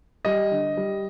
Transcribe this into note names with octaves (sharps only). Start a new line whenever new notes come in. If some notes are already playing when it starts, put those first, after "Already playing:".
G3 D#5
D3
G3